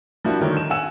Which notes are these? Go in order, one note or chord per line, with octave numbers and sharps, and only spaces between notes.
F3 G3 A#3 D4 E4 F#4
D3 D#3 A3 A#4 C#5
E7
F#5 G#5 E6 E7